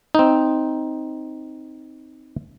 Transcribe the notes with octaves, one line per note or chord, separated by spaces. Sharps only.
C4 D#4